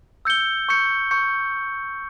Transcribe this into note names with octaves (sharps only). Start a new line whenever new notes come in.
E6 G6 C#7 G7
C#6 G6 C#7
C#6 G6 C#7